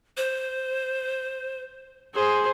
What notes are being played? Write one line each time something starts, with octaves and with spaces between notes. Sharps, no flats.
C5
G#4 C5